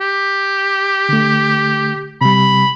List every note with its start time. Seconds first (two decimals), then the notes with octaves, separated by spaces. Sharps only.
0.01 G4
1.09 D3 A3
2.21 C3 G3 B5